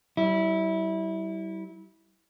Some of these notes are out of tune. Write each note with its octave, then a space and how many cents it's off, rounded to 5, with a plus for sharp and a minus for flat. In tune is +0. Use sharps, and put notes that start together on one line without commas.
G3 -40 E4 -20